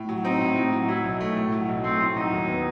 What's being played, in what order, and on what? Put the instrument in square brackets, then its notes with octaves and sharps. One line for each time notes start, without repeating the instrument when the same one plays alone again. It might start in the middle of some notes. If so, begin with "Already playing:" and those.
Already playing: [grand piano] A2
F#3
[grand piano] C4 [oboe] D#4
[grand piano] A2
A2
F#3
[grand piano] F#3 [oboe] E4
[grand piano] B1
A3
A2
F#3
B1
[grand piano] A3 [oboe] C4
[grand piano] A2
[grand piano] F#3 [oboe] D#4
[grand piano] D#2
B3